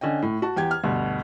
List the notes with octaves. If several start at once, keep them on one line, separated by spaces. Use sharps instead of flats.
D3 C#4 D#5 G5
A2
F#4 A5
E2 G4 G5 G#6
F6
D2 G2 B2